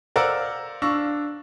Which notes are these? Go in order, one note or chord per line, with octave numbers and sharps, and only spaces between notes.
A#4 C5 D5 F5 F#5 E6
D4 F5 C#6 E6 A#6